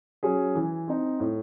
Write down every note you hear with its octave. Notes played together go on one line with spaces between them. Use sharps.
F#3 C#4 G#4
E3
C4 D#4
A2